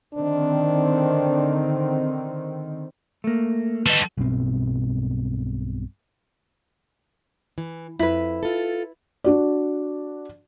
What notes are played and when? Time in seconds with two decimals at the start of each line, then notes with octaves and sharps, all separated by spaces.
0.14 D3 D#3 C4 D4
3.24 A3 A#3
3.86 G3 A4 B4 D#5
4.18 B1 G2 B2 C4
7.58 E3
7.99 F2 E4 B4
8.43 F4 A4
9.24 D4 F#4 D5